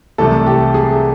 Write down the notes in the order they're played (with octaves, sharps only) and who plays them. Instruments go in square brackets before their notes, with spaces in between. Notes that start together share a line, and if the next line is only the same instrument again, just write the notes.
[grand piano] C2 C3 E3 A3 A4
G4
G#4